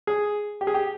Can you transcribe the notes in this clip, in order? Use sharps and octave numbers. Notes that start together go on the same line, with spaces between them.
G#4
G4
G#4
G4